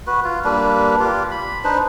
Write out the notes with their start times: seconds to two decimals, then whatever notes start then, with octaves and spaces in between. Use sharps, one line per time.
0.07 F#4 B4
0.24 F4
0.45 G3 A#3 D4 B4
1.00 F4 G4
1.31 B5
1.64 D4 D#4 B4 C5